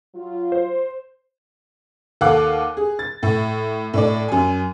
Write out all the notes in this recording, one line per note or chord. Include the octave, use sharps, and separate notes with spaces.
F#3 F4
C5
D#2 A4 F5 F#5 D6 F#6
G#4
A6
A2
A2 D4 D5
F#2 G#5